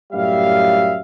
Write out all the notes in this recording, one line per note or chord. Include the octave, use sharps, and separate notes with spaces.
F#2 A2 G3 E5 F5